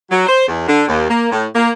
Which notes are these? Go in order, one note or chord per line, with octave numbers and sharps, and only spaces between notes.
F#3
C5
E2
D3
D#2
A#3
A2
A#3